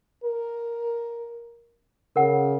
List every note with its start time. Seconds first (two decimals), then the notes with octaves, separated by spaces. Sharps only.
0.24 A#4
2.16 C#3 A#4 F#5